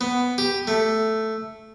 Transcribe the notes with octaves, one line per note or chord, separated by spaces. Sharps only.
B3
G4
A3